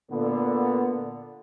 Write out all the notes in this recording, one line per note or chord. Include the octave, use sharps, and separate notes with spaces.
A#2 D3 B3